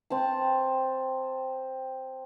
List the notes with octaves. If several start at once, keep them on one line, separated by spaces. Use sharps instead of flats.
C4 G5 A5